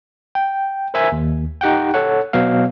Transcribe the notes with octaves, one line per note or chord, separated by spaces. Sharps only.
G5
A#4 C5 E5 G#5
D#2
D#4 G4 F#5 G5
A4 C#5 F#5
B2 F#3 B3 F5